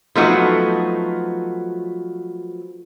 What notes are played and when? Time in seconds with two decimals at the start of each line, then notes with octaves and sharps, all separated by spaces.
0.15 F3 F#3 A3 B3 D#4 F#4